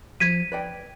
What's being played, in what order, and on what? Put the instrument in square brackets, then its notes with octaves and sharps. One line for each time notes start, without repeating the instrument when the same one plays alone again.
[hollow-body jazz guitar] F3 [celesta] G#6 B6 D#7
[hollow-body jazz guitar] B4 D5 G5